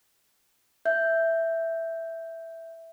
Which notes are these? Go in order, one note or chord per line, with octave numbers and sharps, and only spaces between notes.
E5 G6